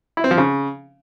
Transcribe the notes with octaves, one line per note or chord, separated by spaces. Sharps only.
E4
C4
F3
C#3